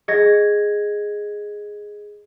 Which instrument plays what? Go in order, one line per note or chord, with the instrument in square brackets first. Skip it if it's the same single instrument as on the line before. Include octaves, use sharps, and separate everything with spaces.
[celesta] G#4 D#5 G#6 A#6